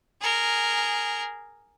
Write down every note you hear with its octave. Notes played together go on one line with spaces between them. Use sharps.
G#4 A#4